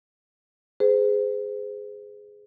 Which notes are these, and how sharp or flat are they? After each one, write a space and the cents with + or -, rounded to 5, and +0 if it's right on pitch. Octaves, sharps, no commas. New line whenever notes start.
G#4 +0 C5 -35